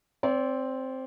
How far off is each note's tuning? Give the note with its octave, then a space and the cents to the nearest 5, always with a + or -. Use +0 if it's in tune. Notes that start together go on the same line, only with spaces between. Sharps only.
C4 +0 D5 -40